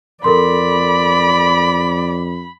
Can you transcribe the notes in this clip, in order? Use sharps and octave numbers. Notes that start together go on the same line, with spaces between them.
F2 A4 A#4 D5 B5 C6